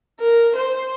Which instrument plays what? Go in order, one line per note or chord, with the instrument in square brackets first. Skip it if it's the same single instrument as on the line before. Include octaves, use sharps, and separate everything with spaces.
[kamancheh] A#4
C5